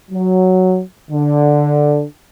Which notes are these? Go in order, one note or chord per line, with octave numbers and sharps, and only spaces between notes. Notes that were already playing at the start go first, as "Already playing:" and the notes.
F#3
D3